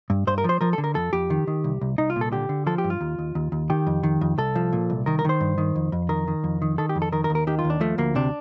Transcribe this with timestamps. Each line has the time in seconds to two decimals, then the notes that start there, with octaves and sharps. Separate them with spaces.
0.10 G2
0.27 G2 C5
0.38 A#4
0.44 F3 C5
0.61 F3 A#4
0.73 D3 A4
0.84 A#4
0.95 F2 A4
1.13 F2 G4
1.30 D#3
1.47 D#3
1.64 C2
1.81 C2
1.98 C2 D#4
2.10 F4
2.16 A#2
2.21 A4
2.32 D3 G4
2.49 D3
2.67 F3 A4
2.78 G4
2.84 G2
2.90 F4
3.01 D#2
3.19 D#2
3.35 D#2
3.52 D#2
3.70 D#3 G4
3.87 F2
4.03 D#3
4.21 F2
4.38 C2 A4
4.55 F3
4.73 A#2
4.90 C2
5.06 D#3 A#4
5.19 A#4
5.25 D#3 C5
5.41 G2
5.58 D#3
5.75 F2
5.92 F2
6.09 D#3 A#4
6.27 D#3
6.44 F2
6.62 D#3
6.78 D#3 A4
6.89 G4
6.95 F2
7.02 A4
7.12 D#3 A#4
7.24 A#4
7.30 D#2
7.35 A#4
7.47 D#3 G4
7.59 F4
7.64 D#2
7.70 D4
7.81 F3 A3
7.98 D2 A#3
8.15 C3 D4